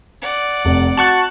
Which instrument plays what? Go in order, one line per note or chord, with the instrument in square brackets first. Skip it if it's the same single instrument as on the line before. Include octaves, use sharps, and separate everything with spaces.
[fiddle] D5 F#5
[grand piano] F1
[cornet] F#4 [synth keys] A5 C#6 F#6 [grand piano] C#7 F#7